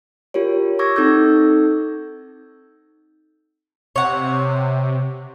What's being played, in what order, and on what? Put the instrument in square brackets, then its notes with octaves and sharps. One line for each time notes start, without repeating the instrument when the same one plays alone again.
[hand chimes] F4 G4 A#4 C#5
C#6 D6 E6 G#6 A#6
C4 D#4 A4 E6 G6
[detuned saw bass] C3 [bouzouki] C#5 F#5